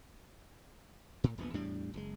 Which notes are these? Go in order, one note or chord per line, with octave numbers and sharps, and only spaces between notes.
A2
D#1 A#1 B3
E2 A2 G3 D4
F#1 A#2 G#3